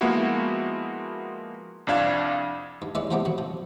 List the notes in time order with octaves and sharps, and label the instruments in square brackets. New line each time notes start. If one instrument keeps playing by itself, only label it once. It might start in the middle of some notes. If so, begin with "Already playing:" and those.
[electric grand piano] F3 G#3 A#3 B3 E4 F#4
C2 F2 D4 F5 G#6 E7
[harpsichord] G2
G#3 C#4 E4 B4 D5
F3 G3 A3 B3 C4 G4
F#3 F#4
F3